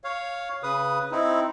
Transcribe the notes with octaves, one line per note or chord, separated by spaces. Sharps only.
C#5 F5
C#3 B4 D#6
C4 D#4 E4